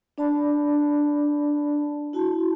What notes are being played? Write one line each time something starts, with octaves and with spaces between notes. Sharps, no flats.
D4 D5 A5 B5
E4 F#4 A5